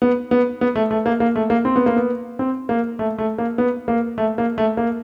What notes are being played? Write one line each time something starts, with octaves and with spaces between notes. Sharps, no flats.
B3
B3
B3
A3
A3
A#3
A#3
A3
A#3
C4
B3
A#3
B3
C4
A#3
A3
A3
A#3
B3
A#3
A3
A#3
A3
A#3